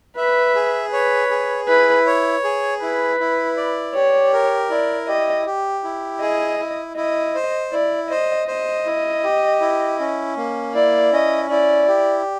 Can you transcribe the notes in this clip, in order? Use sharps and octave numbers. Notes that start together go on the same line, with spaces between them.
B4 E5
G#4
B4 C#5
G#4
E4 B4
C#5
G#4
E4 B4
E4
D5
G4 C#5
A#4
E4 D5
G4 D#5
G4
E4
G#4 D#5
E4
E4 D#5
C5
E4 D5
C5 D#5
C5 D#5
E4
G4
E4
C#4
A#3
E4 D5
C#4 D#5
E4 D5
G4